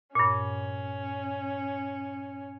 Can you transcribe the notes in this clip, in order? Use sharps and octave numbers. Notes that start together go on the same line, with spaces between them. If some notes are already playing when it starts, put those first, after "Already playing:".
G2 A#2 C#4